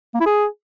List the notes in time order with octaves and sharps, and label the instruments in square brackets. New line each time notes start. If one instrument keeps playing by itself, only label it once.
[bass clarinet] A#3
E4
G#4